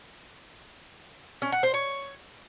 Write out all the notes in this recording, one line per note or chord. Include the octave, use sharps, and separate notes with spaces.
C#4
F#5
C5
C#5